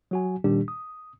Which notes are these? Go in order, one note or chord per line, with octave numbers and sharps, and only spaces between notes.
F#3 F#4 G#5
A#2 D#3 G3 D4 G4
D#6